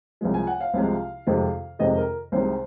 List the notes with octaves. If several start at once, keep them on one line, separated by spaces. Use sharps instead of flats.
C2 C3 F3 G#3
G#5
F#5
F5
C2 C3 F3 G#3
F2 C3 D#3 G#3
F2 C3 D#3 G#3 D#5
A#4
C2 C3 D#3 G#3 C5